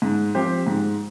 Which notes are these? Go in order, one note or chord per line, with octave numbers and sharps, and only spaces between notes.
G#2
F3 C4 G4 C5
G#2